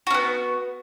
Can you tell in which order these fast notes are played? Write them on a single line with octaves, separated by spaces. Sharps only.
F#4 C#4 B3